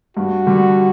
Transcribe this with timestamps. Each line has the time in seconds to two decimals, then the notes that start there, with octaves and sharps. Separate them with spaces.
0.17 G2 F#4
0.47 D3 G3